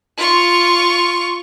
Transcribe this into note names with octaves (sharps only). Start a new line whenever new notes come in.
F4 C#6